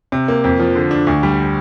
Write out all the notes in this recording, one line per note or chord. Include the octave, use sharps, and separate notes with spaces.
C3
A#3
F2
F3
D3
D4
D2
G3